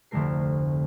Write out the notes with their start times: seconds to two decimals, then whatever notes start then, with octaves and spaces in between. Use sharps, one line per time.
0.11 F1 D2 D3 A3 A#4 C7